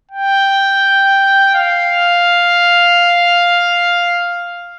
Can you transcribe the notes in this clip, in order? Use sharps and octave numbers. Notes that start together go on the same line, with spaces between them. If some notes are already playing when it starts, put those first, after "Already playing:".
G5
F5